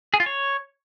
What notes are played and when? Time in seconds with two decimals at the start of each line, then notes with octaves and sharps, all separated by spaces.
0.14 G#4
0.20 F4
0.26 C#5